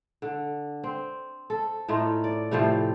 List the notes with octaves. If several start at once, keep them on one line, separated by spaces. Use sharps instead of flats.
D3
C4
A4
A2 A3 D#4 F4
D5
A2 C3 F3 A3